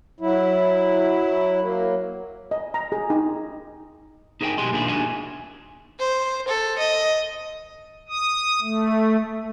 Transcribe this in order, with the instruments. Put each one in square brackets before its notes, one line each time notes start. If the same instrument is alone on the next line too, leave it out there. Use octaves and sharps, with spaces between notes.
[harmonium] F#3 E4
F#3 A#3
[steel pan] D#5
A#5
G#4
D#4
[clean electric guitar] D#4 G#4 A#4 D#5 G5 G#5
B1 B2 G4 G#4 G#5 C6
A#2 D#3 A#3 D4 E4 G#4
D4 D#4 F#4 G#5
[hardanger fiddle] C5
A4
D#5
[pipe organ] D#6
A3